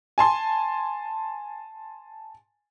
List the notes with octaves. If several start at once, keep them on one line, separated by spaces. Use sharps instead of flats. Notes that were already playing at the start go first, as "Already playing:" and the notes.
G#5 A5 C6